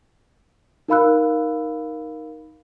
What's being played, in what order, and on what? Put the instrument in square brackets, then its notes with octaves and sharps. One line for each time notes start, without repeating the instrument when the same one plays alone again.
[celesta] D#4 A#4 F5 B5 E6 F#6